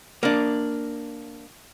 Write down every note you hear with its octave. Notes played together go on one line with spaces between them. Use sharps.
A#3 D4